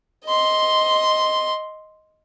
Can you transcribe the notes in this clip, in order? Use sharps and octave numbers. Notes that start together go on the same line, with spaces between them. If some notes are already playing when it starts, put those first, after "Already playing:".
D#5 C6